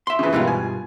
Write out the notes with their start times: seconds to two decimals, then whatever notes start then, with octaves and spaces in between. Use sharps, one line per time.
0.07 E5 C6
0.19 C#3 E3
0.33 G2 B2 D#3 E3 G#3 F4
0.47 G#5